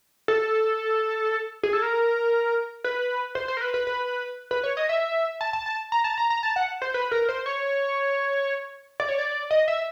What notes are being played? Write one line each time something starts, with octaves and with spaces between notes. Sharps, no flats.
A4
G#4
A4
A#4
B4
C5
C5
A#4
B4
B4
B4
B4
C#5
D#5
E5
A5
A5
A5
A#5
A5
A#5
A#5
A5
F#5
C5
B4
A#4
C5
C#5
D5
C#5
D5
D#5
E5